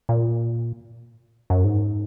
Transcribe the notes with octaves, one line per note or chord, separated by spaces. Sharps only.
A#2
F#2
G#2